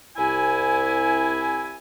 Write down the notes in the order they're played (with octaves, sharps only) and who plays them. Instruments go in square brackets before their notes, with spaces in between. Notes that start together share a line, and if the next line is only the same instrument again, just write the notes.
[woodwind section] C2 E4 G#5